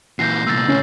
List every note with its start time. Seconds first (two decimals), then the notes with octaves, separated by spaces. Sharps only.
0.19 A#2 E3 G6 A#6 C7
0.47 C2 A#2 E6 A6
0.68 C#2 A2 C#4